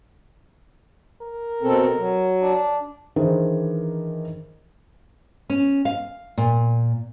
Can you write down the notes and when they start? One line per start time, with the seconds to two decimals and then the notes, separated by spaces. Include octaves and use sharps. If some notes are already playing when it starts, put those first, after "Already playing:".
1.22 A#4
1.63 B2 C4 A4
1.99 F#3
2.42 D4
3.16 D#3 E3 D4 G#4 A#4 C5
5.50 C#4
5.85 F5
6.38 A#2